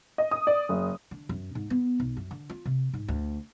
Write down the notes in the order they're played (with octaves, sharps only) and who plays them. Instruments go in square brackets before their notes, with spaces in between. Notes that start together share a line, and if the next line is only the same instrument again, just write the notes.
[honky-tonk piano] D#5
D#6
D5
F#1
[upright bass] D3
F#2
G#2
B3
B1
F#2
D3
F4
C3
G#2
D2